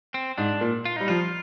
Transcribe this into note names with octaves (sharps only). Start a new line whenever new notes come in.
C4
G#2 D4
A#2
F4
G3 D#4
F3 F4